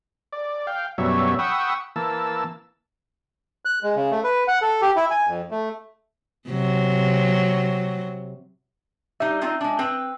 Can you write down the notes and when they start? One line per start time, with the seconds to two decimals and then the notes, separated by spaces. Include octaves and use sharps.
0.33 D5
0.67 F5 G5
0.98 F#2 B2 F#3 G3 C#5 E5
1.39 F#5 G5 B5 C#6 D#6 E6
1.96 E3 A#3 A5 E6
3.65 F#6
3.83 G#3
3.96 C#3
4.11 A3
4.24 B4
4.48 F#5
4.62 A4
4.82 G4
4.96 E4
5.11 G#5
5.27 F2
5.51 A3
6.48 C3 F#3
9.20 G3 D#4 E5
9.41 C4 D#4 F4
9.61 G#3 D4
9.79 C4 B4 G5